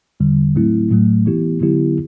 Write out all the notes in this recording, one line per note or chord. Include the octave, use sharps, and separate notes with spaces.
E2 D3 G3
A2 F#3 A3 C4 E4
A2 F#3 A3
E3 B3 E4 G4
D3 F#3 B3 E4 G4